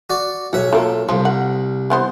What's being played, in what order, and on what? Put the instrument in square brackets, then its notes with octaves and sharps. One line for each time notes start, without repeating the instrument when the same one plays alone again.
[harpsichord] F#4 D5
[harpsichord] B1 E5 [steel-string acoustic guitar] F#4 G#4 C#5
[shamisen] A3 A#3 [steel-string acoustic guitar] F4 A4
[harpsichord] C2 [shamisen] F3 [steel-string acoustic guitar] G3
[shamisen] F#5
E3 B3 C5